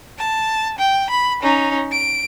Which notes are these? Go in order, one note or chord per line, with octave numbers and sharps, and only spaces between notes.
A5
G5
B5
C#4 D#4
D7